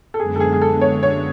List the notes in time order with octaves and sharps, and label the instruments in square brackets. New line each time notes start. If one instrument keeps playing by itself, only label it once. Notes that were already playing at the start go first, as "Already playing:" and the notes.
[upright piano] A4
[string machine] F#2 D3 G#3 B3 D4 [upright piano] G#4
[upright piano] A4
G#4
G#4
A4
C#5
C#5